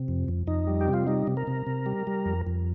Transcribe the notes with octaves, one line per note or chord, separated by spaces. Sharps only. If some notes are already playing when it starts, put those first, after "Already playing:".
Already playing: C3
F2
F2
F2 D#4
G3
G4
C3
F4
G3 D#4
C3
A#4
C3
C3
G3
G3
F2
F2